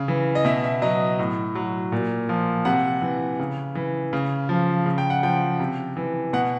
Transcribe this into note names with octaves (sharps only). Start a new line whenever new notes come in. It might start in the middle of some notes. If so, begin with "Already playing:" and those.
Already playing: C#3
E3
D#5
B2 E5
E5
F#3 D#5
A2
F#3
A#2
F3
C3 F#5
E3
C#3
E3
C#3
F3
C#3
G5
F#5
F3 G5
C3
E3
B2 F#5